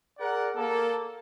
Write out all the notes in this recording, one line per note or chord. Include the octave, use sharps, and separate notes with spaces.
G#4 A#4 D5 F#5
A#3 A4